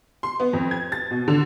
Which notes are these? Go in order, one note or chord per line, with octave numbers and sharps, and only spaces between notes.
C6
B3
F2
G#6
A6
B2
D3